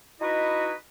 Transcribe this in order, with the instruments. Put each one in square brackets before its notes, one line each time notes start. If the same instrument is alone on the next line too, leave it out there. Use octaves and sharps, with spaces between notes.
[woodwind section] D#4 E4 F#4 B4 D#5